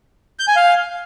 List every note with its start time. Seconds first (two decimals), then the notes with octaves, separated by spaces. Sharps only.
0.39 G6
0.48 G#5
0.56 F5